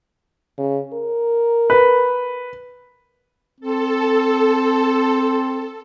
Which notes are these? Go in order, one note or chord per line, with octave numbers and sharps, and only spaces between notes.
C#3
A#4
B4
C4 A4